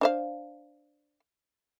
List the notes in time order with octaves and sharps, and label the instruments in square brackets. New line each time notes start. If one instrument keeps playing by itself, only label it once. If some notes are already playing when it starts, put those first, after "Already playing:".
[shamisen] D4 C5 F5